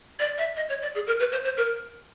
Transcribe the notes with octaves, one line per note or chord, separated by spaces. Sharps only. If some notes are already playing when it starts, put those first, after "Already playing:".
D5
E5
D#5
C#5
D5
G#4
A#4
B4
C5
C5
A#4